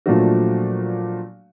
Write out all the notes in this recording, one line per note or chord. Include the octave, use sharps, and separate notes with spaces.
A#2 F3 F#3 A3 D4 F#4